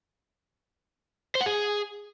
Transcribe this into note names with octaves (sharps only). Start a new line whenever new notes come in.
C5
F#5
G#4